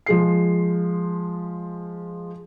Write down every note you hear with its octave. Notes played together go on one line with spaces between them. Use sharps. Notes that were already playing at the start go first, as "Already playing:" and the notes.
F3 G#3 C7